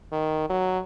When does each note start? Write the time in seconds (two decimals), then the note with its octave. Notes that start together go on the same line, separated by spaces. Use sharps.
0.12 D#3
0.50 F#3